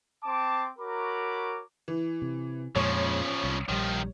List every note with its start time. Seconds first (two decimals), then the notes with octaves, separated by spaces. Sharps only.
0.24 C4 A5 C6 D6
0.79 F#4 A#4 C#5 A#5 B5 D6
1.88 E3
2.22 C3
2.76 F2 A#2 C#3 F3 G#3 C#5 C#6
3.43 C2
3.69 A#1 D#3 F3 G3